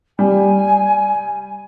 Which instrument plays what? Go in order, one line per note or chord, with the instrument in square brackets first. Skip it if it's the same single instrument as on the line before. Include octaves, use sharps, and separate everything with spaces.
[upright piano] G3 [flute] G#5